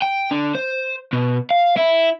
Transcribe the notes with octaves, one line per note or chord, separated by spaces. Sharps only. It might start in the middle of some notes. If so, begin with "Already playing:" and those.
G5
D3
C5
B2
F5
E4